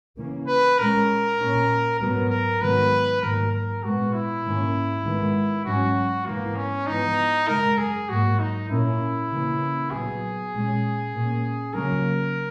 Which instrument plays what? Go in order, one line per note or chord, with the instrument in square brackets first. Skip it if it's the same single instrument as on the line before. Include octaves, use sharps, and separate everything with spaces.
[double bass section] C#3 E3 A#3 C#4
[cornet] B4
[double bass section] A#2 G#3 C#4 [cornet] A#4
[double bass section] A#2 A#3 C#4
[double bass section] G#2 F#3 B3 [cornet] A#4
[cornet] A#4
[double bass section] G#2 D#3 F#3 B3 [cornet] B4
[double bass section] G#2 D#3 F#3 A#3 [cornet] A#4
[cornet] A#4
[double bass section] A#2 G#3 B3 [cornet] F#4
[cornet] E4
[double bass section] G#2 D#3 A#3 C#4
G#2 D#3 G#3 B3
[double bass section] G#2 F#3 C#4 [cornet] F#4
[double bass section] G#2 E3 B3 [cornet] A#3
[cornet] C#4
[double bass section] G#2 E3 B3 [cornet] D#4
[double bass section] F#2 C#3 G#3 [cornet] A#4
[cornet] G#4
[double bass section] G#2 F#3 A#3 [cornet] F#4
[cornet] D#4
[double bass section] A#2 A#3 C#4 [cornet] E4
[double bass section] C#3 E3 A#3 C#4
[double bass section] A#2 F#3 B3 [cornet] G#4
[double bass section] A#2 G#3 C#4
A#2 A#3 C#4
[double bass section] C#3 F#3 A#3 C#4 [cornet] A#4